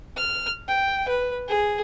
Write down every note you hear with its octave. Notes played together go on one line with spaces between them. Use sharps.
F6
G5
B4
G#4